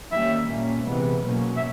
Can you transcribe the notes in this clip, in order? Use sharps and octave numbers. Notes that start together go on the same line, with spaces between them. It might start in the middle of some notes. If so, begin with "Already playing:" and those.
D#3 G3 A#3 C#4 E5
A#2 G3 A#3 C#4
C3 E3 G#3 B3
B2 F#3 A#3 C#4
E5